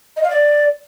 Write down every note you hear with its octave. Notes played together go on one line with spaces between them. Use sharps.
D#5
F5
D5